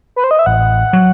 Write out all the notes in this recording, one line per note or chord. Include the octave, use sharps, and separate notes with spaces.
B4
C5
D#5
E5
A1 F#5
F#3